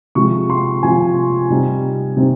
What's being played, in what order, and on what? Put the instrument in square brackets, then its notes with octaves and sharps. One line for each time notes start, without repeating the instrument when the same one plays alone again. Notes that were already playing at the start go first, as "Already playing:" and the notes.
[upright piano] C3 F3 G#3 C#6
C6
C3 F3 G#3 G#5
C3 G3 C4 D#4
C3 G3 C4 D#4